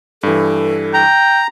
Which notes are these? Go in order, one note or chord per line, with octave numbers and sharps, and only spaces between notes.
G2 E3 A4
G5 A#5